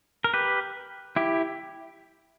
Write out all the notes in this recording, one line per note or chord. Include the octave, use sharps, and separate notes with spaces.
A#4
G4 B4
E4 G4